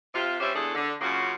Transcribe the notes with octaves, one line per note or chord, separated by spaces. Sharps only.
C3 F4
G3 C#4 G4 C5 E5
E2 D3 G#4 A4
D3
F#2 C#3 A#3 F4 F#4